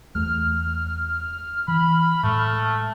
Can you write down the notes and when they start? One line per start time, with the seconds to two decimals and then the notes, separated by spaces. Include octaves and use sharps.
0.15 E2 A3 F6
1.68 E3 B5
2.23 A2 G#3 A3